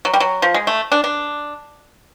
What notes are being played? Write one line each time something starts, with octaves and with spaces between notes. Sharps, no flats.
F#3
G3
F#3
F3
G#3
A3
D4
D4